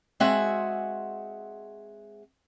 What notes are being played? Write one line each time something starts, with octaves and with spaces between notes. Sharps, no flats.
G#3 C4 F#4 G#4 E5 F#5